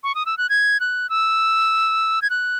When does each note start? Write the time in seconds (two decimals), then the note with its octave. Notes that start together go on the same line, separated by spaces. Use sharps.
0.04 C#6
0.15 D#6
0.26 E6
0.38 F#6
0.50 G#6
0.80 F#6
1.10 E6
2.22 G#6
2.30 F#6